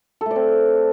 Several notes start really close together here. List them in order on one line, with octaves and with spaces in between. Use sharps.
A4 A3 D5 C4